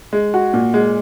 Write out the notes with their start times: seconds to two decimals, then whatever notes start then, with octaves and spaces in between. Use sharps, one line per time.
0.13 G#3
0.34 F#4
0.53 A#2
0.74 G#3